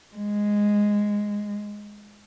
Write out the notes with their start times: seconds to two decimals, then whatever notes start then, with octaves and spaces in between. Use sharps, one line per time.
0.16 G#3